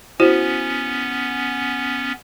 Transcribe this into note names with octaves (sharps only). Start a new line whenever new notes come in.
B3 C#4 E4 F#4 C5